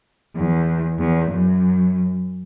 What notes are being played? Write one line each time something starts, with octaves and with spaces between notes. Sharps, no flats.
E2
E2
F#2